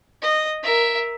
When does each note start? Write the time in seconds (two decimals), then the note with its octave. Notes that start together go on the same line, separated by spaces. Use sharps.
0.22 D#5
0.63 A#4 E5